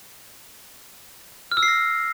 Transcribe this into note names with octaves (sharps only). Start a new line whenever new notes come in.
F6
E6
C7
A#6